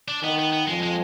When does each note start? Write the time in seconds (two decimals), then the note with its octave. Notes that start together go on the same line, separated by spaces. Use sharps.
0.08 D4
0.23 D#3 B3
0.39 B3
0.52 B3
0.67 F2 F3 G#3
0.83 G#3